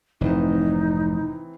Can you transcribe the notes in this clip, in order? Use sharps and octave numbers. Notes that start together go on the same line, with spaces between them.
F1 G#2 E3 C4 D#4